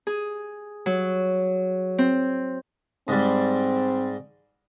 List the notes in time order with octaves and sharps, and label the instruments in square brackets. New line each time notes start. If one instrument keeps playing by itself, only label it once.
[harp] G#4
F#3
C4
[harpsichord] G#2 G3 [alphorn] C4